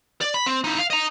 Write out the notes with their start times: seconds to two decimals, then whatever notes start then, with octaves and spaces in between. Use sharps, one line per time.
0.21 D5
0.34 B5
0.46 C4
0.64 D#4 E4
0.79 F5
0.90 D#5 A#5